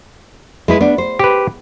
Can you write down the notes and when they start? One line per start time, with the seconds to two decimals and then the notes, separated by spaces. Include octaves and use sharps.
0.68 G#3 E4 B4
0.81 B3 D4
0.98 C5
1.19 G4 B4